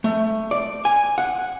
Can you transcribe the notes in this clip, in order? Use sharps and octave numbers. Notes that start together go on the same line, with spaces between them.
A3
D5
G#5
F#5